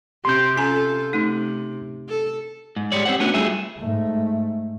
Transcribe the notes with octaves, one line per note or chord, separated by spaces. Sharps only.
C3 C4 G4 C6 G6
C#4 F4 A4 G#5 A#5
C3 A3 D#4
A4
G#2
G3 G#3 C#5 D5
C4 G4 C5 F#5
A3 B3 C#4 D4 F#4
G3 A3 F4 G#4 E5
G#2 A3